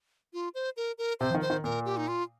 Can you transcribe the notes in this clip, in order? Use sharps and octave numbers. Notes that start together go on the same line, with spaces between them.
F4
C5
A#4
A#4
C3 C5
F3
D#3
C5
D#3
A#2 A#4
G4
D#4
F4